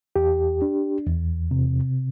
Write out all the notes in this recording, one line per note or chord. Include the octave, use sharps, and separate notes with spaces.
E2 G4
D4
E2
C3